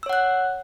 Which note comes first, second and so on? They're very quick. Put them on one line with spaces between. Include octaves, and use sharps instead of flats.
E6 C#5 F#5 F#6